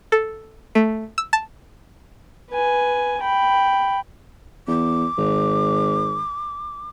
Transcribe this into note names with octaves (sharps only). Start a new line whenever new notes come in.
A4
A3
E6
A5
B4 G#5
G5 B5
E2 D6
G#1